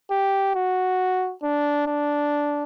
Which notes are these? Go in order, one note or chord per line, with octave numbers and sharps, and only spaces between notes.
G4
F#4
D4
D4